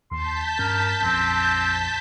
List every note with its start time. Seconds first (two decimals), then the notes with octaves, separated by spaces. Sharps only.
0.12 D#2 A5 C6 G6 B6
0.59 G2 C#4 A#4
1.02 A#1 F2 C4